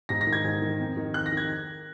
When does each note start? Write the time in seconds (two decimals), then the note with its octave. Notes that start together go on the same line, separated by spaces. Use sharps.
0.09 G#2 A#6
0.21 A#6
0.27 D#3
0.32 G#6
0.45 G#2
0.62 D#3
0.80 F2
0.97 D#3
1.14 F2 F#6
1.26 A#6
1.32 D#3 G#6